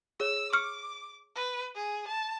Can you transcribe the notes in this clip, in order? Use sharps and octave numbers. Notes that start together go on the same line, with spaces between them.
G#4 C#5 E6
C#6 D6 F6 C#7
B4
G#4
A5